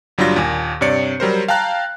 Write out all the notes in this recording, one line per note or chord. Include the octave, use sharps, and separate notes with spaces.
G1 F#3 G3 D4 F4 A#6
D#2 A#2 G#5
G2 C3 C#5 D5 C#7
F#3 G3 A#4 C5
F5 G5 A5 A#5 F#6